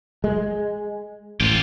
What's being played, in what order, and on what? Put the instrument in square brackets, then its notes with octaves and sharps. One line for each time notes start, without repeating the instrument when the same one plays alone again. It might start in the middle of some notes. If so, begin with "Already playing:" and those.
[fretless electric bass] G#3
[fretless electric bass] A1 [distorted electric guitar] F4 G4